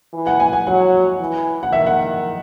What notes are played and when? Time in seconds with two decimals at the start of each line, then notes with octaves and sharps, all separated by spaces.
0.13 E3
0.27 F#5
0.40 G#5
0.53 G#5
0.67 F#3 F#5
1.19 E3
1.63 F#5
1.72 D#3 E5
1.86 F#5